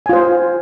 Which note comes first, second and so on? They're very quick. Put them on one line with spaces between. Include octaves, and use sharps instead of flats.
G#5 F4 C5